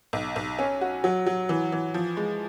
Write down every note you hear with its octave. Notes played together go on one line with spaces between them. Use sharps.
B1
B1
C#4
F#4
F#3
F#3
E3
E3
F3
G#3